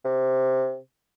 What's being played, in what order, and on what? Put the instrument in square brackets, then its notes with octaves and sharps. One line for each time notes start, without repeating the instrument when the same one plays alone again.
[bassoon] C3